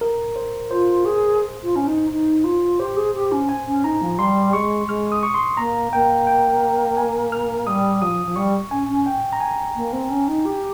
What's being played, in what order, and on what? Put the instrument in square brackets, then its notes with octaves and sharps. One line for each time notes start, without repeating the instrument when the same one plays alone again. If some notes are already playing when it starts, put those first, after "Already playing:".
[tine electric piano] A#4
C5
[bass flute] F4 [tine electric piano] C5
[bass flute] G#4
F4
C#4
D#4
D#4
F4
[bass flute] G4 [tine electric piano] C5
[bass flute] G#4
G4
C#4
[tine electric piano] G#5
[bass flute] C#4
[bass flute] D#4 [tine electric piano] A#5
[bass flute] F3
[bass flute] G3 [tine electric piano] C6
[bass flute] G#3 [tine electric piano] C#6
[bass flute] G#3 [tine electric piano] F6
[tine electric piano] D#6
C#6
C6
[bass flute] A#3 [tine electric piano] A#5
[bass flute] A#3 [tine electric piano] G5
[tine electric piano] G5
G#5
F6
[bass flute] G3 [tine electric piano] D#6
[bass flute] F3 [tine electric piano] D#6
[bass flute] F3
[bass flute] G3 [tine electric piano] C#6
[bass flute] C#4 [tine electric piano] G#5
[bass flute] C#4
[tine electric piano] G5
A#5
G#5
[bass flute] A#3
C4
C#4
D#4
G4